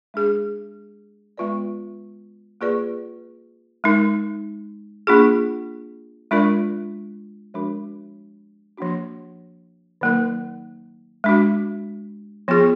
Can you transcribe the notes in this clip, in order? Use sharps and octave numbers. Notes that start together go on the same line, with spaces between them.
G#3 D4 G#4
G#3 B3 F4 B4 D5
A#3 F4 G#4 B4 D5
G#3 D#4 A#4
A#3 D4 F4 G#4
G#3 D4 F4 A#4 D5
F3 G#3 D4 F#4 A#4
F3 A#3 D4 F#4
D#3 F#3 A#3 D#4 A#4
G#3 D4 F#4
F3 B3 F4 G#4